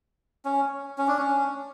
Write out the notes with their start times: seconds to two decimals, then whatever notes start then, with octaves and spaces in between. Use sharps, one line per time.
0.45 C#4
0.98 C#4
1.08 D4
1.18 C#4